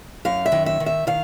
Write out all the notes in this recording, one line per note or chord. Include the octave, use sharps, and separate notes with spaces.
F#2 F5
E5
D#3
E5
D#3
E5
D#3 F5